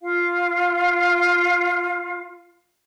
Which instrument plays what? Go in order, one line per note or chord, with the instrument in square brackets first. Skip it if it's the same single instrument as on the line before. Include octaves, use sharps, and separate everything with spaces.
[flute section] F4 F5